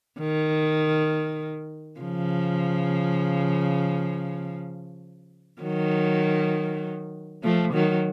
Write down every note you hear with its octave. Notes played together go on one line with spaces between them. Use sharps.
D#3
C#3 F3
D#3 F#3
F3 A3
D#3 F#3